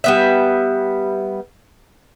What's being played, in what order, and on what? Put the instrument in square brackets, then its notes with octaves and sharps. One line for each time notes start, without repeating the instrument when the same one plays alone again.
[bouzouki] G3 B3 E5